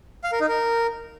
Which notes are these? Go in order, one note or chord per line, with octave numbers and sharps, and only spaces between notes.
F5
A#4
D#4
A#4